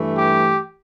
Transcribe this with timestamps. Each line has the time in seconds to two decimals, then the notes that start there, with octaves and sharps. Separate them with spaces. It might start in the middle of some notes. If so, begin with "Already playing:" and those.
Already playing: G2 E3 A3
0.17 G4